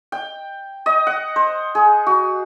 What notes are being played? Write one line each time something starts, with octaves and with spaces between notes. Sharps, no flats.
G5
D#5
F#5
C5
G#4
F#4